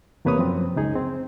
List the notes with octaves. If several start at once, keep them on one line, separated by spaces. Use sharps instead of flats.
E2 C3 A#3 B4 C#5 D#6
F#2 F3 C4
C#2 F#2 D#4 G#4
C4